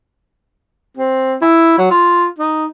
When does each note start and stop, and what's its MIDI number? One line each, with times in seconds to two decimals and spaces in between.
0.97 1.36 60
1.41 1.75 64
1.78 1.87 54
1.91 2.26 65
2.39 2.66 63